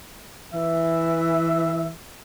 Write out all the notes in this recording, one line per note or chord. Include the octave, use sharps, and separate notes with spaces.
E3 E5